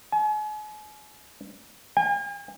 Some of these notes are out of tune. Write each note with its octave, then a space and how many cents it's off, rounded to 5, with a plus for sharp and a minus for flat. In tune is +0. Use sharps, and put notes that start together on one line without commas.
G#5 +40
G#5 -45